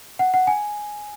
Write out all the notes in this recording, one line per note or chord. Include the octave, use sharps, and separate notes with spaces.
F#5
F#5
G#5